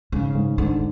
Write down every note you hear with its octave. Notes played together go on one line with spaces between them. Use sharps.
G#2 C#3
G#2
G#2 D3